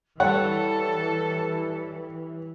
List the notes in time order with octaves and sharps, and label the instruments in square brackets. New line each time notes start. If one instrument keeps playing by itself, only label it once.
[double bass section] E3 [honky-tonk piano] G3 C#5 [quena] A4 [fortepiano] F#5